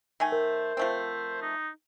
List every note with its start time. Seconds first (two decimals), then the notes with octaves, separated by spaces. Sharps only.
0.20 D#3 A3 G#5
0.32 A#4 C5
0.77 F3 A3 C4
1.42 D#4